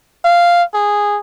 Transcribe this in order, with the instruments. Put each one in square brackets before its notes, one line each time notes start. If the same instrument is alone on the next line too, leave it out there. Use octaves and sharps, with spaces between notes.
[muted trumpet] F5
G#4